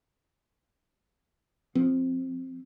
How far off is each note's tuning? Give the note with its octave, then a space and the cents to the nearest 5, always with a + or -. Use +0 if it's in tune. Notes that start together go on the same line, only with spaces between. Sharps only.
F3 +0 C4 +0